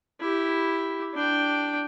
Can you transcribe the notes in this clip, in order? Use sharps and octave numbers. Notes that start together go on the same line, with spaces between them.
E4 G4
D4 G5